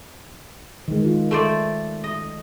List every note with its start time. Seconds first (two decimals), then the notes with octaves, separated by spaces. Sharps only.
0.88 D#3 G#3
1.05 F4
1.31 A3 C5 D5
2.04 D#5